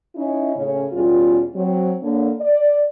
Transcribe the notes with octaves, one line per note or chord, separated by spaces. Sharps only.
C#4 D#4 E4
A2 C#3 C#4
E2 B2 E3 G3 C#4 F4
F#3 C4
D3 A#3 C#5
D5